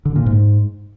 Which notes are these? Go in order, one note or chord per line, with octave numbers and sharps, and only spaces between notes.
D3
A#2
G#2